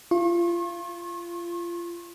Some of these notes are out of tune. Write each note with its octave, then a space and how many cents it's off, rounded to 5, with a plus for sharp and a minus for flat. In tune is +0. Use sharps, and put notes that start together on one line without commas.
F4 -25 C#6 -45